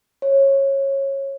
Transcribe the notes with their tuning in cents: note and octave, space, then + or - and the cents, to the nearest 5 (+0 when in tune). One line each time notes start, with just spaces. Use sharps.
C#5 -20